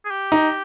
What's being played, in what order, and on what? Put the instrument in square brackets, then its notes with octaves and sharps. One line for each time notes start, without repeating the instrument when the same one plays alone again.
[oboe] G#4
G4
[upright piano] D#4